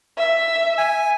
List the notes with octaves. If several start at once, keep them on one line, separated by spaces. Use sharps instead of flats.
E5
G#5